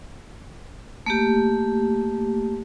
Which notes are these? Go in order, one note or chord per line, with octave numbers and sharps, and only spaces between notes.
A3 A#3 G4